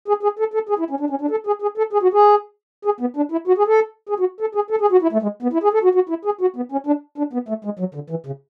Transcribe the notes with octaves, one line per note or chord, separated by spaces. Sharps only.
G#4
G#4
A4
A4
G#4
E4
C#4
D4
C#4
D4
A4
G#4
G#4
A4
G#4
F#4
G#4
G#4
B3
D4
E4
F#4
G#4
A4
G#4
F#4
A4
G#4
A4
G#4
F#4
E4
A3
G#3
B3
E4
G#4
A4
F#4
F#4
E4
G#4
F#4
B3
C#4
D4
D4
B3
A3
G#3
F#3
D3
E3
C#3